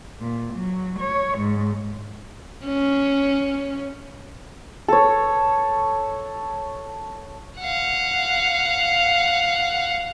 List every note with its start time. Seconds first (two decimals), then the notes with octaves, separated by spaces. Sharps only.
0.21 A#2
0.54 F#3
0.99 C#5
1.39 G#2
2.65 C#4
4.88 A4 C#5
7.59 F5 F#5